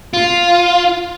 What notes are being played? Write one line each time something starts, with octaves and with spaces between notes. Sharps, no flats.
F4